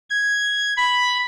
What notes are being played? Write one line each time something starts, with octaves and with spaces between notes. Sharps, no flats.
G#6
B5